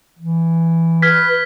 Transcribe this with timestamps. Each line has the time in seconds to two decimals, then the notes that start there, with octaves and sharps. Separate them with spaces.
0.19 E3
1.02 B4 F6 G#6 B6